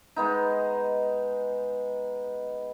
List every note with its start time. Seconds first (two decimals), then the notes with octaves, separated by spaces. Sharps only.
0.16 G#3 B3 D#4